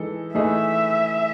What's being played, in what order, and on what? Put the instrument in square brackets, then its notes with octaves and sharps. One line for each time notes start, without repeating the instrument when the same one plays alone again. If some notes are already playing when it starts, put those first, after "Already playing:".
Already playing: [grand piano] E3 G#3 D#4 A4
[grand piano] E3 A3 D#4 G#4 B4 [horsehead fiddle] E5